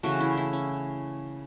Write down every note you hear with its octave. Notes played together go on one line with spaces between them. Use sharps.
C#3 E3 A3 F#4
E4
E4
C#4